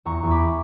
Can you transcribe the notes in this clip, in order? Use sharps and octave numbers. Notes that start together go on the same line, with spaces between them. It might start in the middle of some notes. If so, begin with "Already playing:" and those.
E2 A#5 C#6
E2
B5 D6